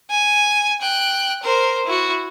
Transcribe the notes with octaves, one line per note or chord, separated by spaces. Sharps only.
G#5
G5 F#6
A#4 C5
E4 F#4